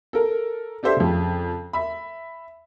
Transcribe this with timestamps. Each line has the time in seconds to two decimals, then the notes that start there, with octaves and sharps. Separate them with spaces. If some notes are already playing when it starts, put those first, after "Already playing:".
0.13 A4 A#4
0.83 D4 G4 A4 C5 E5
0.97 F2 C#3
1.73 E5 B5